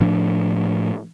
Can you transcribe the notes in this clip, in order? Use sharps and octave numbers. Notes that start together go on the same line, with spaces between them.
A2 F3 D4